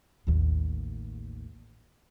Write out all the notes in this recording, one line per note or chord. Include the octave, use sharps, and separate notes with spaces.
A1 D#2